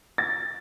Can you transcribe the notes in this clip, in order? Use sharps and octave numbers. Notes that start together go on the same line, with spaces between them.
A6